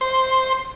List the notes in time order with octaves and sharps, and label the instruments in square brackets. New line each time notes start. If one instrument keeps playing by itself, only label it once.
[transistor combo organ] C5